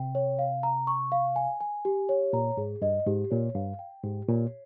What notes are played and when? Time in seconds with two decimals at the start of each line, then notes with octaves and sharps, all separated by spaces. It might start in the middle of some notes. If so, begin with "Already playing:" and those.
Already playing: C3 G5
0.15 C#5
0.39 F5
0.63 A#5
0.87 C#6
1.12 F5
1.36 G#5
1.60 G#5
1.85 G4
2.09 C#5
2.33 A#2 A#5
2.57 G#2 G#4
2.82 G2 D#5
3.06 G#2 G4
3.30 A#2 C#5
3.55 G2 F5
3.79 G5
4.03 G#2 G4
4.29 A#2 C#5